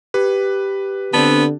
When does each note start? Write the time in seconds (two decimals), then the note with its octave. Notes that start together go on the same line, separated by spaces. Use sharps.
0.14 G4 B4
1.13 D3 B3 C4 D4 A5